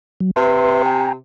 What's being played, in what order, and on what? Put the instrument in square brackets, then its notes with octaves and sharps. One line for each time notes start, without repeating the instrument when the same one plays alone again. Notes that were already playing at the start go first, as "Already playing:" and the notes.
[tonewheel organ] F#3
[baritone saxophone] C3 [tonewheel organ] B4 E5 C6
[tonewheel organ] G5 G#5 A#5